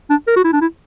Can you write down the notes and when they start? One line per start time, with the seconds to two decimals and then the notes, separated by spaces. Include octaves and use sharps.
0.10 D4
0.27 A#4
0.36 F#4
0.44 E4
0.53 D4
0.61 E4